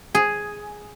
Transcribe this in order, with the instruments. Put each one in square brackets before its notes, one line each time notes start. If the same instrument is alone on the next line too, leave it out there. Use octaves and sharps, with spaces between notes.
[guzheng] G#4